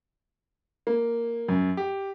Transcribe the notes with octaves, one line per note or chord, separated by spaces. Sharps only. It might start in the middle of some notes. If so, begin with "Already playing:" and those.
A#3
F#2
G4